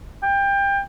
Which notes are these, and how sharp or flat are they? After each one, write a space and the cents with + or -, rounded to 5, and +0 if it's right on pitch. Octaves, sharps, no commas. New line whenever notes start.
G5 +25